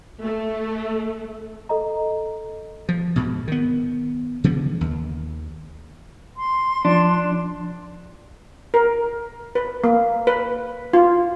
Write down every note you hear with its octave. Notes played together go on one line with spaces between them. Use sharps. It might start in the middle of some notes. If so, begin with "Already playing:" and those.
A3
A4 D#5 A#5
F3
D2 G#2 B2
D#3 B3
C#3 E3 F3 B3
D#2
C6
F3 D4
A#4
B4
A#3
B4
F4